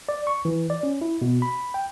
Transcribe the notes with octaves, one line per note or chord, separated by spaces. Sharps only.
D5
C#6
E3
D5
C#4
E4
B2
B5
G5